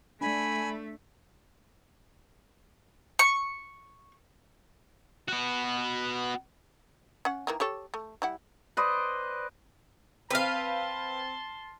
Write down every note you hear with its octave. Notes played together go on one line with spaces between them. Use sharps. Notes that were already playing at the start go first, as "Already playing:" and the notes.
A3 D4 A4 G#5 B5
C#6
B3 F#4
C#4 F#5
D#3 E3 A#3
G4 A4 C#5
A3
G3 E4 F#5
B4 C5 D5 D#5
C4 B4 F5 A5 C6 F6